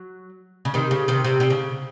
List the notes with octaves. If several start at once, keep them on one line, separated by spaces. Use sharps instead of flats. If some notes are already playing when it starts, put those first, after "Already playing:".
Already playing: F#3
C#3
C3 D#3
C#3
C3 D#3
C3
C3
C#3